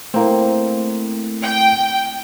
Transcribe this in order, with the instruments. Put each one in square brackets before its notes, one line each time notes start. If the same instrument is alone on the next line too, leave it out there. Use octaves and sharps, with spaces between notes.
[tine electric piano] A3 E4 [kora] A#3 C4
[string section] G5